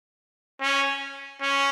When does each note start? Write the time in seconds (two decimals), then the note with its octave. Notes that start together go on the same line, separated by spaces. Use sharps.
0.61 C#4
1.41 C#4